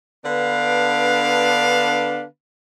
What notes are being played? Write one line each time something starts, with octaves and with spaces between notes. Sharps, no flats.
D3 B3 D4 B4 F5